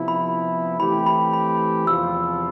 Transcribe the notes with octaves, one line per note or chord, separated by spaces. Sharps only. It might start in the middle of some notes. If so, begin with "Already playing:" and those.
Already playing: C3 F3 B3 E4
B5
E3 A3 C4 G4 B5
B5
B5
E2 C3 F3 C4 F4 E6